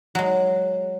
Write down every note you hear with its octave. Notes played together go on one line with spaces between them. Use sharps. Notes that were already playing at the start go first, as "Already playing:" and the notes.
F#3 G#3